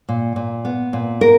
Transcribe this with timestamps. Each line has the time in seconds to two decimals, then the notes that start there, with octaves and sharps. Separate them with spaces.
0.09 A#2
0.36 A#2
0.65 B3
0.93 A#2
1.21 B3 A#4